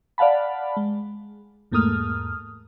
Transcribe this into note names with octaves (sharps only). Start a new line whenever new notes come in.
D5 F5 F#5 A5 B5
G#3
E2 G#2 A3 A#3 D#6 F6